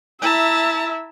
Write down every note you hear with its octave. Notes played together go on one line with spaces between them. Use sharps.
E4 E5 A5 A#5